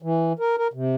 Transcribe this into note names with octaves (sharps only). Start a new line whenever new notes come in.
E3
A#4
A#4
C3